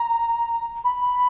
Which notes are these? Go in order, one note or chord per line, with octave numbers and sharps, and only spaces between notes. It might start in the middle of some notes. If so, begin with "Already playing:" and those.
Already playing: A#5
B5